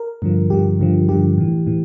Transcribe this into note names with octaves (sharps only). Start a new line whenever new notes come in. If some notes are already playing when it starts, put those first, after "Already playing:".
Already playing: A#4
G2 D3 F3
G2 D3 F3 G4
G2 D3 F3
G2 D3 F3 G4
A2 E3
A2 E3